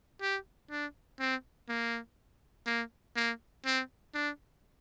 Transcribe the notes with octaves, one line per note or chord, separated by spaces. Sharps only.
G4
D4
C4
A#3
A#3
A#3
C4
D4